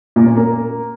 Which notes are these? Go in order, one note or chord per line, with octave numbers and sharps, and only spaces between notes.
A#2
C#4
A#3